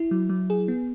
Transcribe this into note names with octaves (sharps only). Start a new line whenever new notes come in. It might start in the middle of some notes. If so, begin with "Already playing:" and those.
Already playing: E4
F#3
F#3
G#4
B3